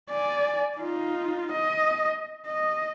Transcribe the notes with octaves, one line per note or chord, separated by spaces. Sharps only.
D5 G#5
D#4 F4
D#5
D#5